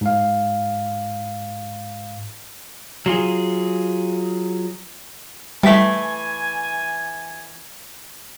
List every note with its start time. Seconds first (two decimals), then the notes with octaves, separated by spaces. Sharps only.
0.01 G#2 F5
3.06 F#3 F4 G#4
5.63 E3 G3 A3 G#5 B6